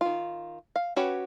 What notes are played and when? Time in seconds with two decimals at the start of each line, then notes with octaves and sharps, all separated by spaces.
0.01 D#3 F4
0.76 F5
0.96 C#4 F#4 G4 B4 C#5